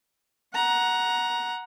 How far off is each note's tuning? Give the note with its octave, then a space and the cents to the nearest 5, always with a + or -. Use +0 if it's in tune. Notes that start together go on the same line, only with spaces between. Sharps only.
F#5 +0 A#5 +15